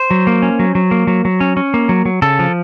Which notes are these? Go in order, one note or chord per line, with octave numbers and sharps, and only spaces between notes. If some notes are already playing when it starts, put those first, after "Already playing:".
Already playing: C5
F#3
A#3
C#4
F#3
F#3
A#3
F#3
F#3
C#4
C#4
A#3
F#3
F#3
C#3 A4
F3